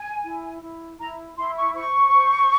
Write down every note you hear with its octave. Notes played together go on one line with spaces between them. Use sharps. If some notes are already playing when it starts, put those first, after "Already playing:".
Already playing: G#5
E4
E4
E4 A#5
E4 C6
C#6
C5 C#6
C5